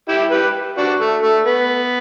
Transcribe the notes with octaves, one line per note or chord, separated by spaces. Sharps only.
E4 G4
G4 B4
D4 F#4
A3
A3
B3